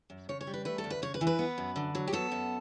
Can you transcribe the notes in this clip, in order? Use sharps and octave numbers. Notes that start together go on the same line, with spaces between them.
F#2
C#3 C#5
C#5
G3
B4
A3 B4
A4
D2
B4
C#3 C#5
B4
E3
B4
B3
F#2
D3
F#3
G4
B3 A4
F#2